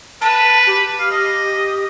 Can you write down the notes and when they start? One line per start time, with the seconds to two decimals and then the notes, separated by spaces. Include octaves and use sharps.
0.21 B4 A5
0.67 G4
0.99 F5
1.11 D#5